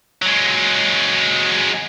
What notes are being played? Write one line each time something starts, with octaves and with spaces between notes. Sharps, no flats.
F#3 G#3